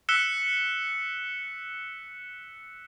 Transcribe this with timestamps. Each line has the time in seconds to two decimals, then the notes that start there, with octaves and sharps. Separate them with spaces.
0.09 E6 F#6 B6 C#7 E7 G7